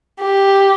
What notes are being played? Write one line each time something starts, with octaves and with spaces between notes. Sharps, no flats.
G4